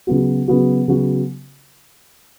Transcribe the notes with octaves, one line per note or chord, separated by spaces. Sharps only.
C#3 F#3 B3 F#4
C#3 F#3 B3 F#4
C#3 F#3 B3 F#4